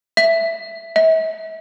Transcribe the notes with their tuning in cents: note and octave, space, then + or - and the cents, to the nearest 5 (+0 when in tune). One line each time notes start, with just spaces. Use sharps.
E5 +10
E5 -40